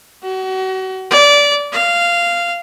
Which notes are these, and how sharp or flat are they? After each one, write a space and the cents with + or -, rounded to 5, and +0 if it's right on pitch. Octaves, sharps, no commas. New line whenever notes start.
F#4 +35
D5 -20
F5 -15